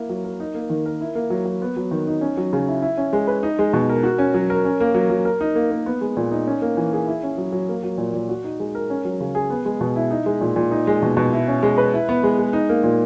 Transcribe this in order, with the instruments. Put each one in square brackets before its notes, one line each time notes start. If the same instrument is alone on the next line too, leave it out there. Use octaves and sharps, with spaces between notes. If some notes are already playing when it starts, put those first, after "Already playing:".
Already playing: [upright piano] A#3 E4
F#3
A#4
D#4
A#3
D#3
A#4
E4
A#3
F#3
F#3
B3
F#3
D#3
D#4
C#4
F#3
C#3
E4
E4
C#4
G#3
B4
D#4
G#3
B2
A#4
F#4
C#4
F#3
A#4
C#4
A#3
F#3
F#3
A#4
D#4
A#3
A#3
B3
G#3
A#2
D#4
C#4
A#3
E3
G#4
E4
C#4
F#3
F#3
A#3
F#3
A#2
A#2
F#4
D#4
G#3
A#4
C#4
F#3
C#3
G#4
B3
G#3
B2
E4
D#4
G#3
A#2
A#2
D#4
G#3
B2
B2
E4
C#4
G#3
B4
E4
B3
G#3
G#3
D#4
A#3
A#2